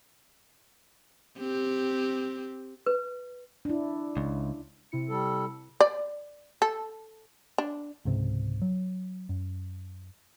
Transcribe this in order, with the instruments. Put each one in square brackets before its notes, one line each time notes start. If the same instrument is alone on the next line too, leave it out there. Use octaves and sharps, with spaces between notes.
[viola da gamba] C4 G4
[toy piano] B4
[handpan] D4 E4
[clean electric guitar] C#2
[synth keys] C3 E4 C#7
[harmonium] G3 A4
[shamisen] D5
A4
D4
[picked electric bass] C#2 G#2 C3
F#3
F#2